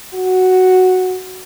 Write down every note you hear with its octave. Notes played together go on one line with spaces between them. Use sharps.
F#4